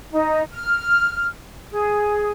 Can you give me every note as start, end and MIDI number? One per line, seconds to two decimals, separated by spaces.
0.12 0.42 63
0.52 1.26 89
1.71 2.31 68